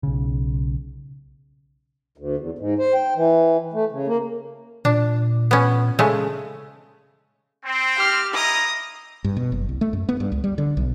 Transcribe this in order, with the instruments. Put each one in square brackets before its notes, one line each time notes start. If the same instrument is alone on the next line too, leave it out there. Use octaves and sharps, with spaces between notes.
[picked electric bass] B1 C#3
[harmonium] D2
E2
G#2
C5
G5
E3
A3
C#3
A#3
[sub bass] A#2 [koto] D4
[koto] B3 C#4
C#3 G#3 A3
[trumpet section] C4
[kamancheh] G4 F6
[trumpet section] E4 D#5 A#5 [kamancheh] D#6
[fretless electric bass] G2
B2
F#1
C2
A3
F#2
B3
G2
C#2
G3
D3
B1